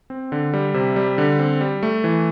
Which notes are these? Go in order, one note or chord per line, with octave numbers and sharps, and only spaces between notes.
C4
D3
G3
C3
G3
D3
C4
G3
A3
E3